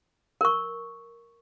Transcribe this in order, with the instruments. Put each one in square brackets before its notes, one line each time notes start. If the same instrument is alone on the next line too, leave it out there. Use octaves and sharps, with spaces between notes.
[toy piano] A#4 C#6